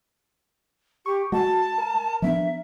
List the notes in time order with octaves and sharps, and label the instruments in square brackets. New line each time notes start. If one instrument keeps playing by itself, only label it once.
[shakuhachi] G4 [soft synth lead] C#6
[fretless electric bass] G#3 [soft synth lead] F#4 [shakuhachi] A5
[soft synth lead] A#4
[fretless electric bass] F3 B3 D4 [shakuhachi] E5